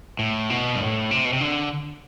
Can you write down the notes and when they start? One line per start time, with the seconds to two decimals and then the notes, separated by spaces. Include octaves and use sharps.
0.19 A2
0.50 B2
0.75 G2
0.80 A2
1.11 C3
1.25 B2
1.33 C3
1.41 D3